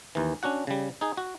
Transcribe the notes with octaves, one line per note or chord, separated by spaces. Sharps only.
D#2 E3
C#4 D4 F#4 F#5
C#3 G3
D#4 G#4
F#4